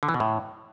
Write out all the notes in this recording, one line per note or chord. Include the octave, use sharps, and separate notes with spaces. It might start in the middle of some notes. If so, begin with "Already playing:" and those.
D3
E3
B2
A2